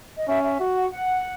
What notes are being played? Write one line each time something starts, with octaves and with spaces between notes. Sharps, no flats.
D#5
C#4 E5
E5
F#4
F#5
F#5